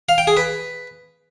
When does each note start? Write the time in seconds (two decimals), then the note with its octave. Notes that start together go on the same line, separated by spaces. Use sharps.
0.09 F5
0.18 G5
0.27 G#4
0.37 B4